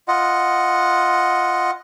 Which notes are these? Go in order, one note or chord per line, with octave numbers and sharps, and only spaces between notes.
F4 D#5 F#5